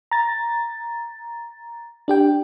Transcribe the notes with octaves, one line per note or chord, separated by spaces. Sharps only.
A#5 A6
D4 G4 G5